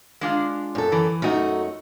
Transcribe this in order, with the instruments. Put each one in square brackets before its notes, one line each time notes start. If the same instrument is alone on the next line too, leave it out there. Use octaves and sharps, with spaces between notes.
[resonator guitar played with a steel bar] G#3 D4 F4
[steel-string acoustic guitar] F#2 A4
[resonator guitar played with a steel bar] E3
[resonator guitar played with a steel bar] F#2 D#4 [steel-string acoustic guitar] A3 F#4